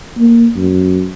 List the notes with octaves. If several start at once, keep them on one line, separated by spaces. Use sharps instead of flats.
A#3
F#2